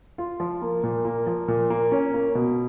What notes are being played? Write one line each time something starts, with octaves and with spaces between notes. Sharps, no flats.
F4
F3
A#3
A#2
A#3
F3
A#2
A#3
C#4
A#3
B2